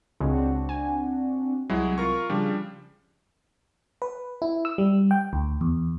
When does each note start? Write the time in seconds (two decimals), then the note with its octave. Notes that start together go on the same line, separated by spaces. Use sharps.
0.20 C#2 C#3 G#3 C4 D4 F#4
0.69 G#5
1.69 C2 F#3 G#3 E4
1.98 F4 A#4 C#6
2.30 C#3 F3 G3 D4
4.02 B4
4.42 E4
4.65 E6
4.78 G3
5.11 G5
5.33 D2
5.61 E2